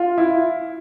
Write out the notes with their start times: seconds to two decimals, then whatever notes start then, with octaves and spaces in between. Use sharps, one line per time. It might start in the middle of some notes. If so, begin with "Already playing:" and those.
Already playing: F4
0.18 E4